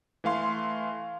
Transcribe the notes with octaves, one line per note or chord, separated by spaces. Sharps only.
E3 A3 F5 C6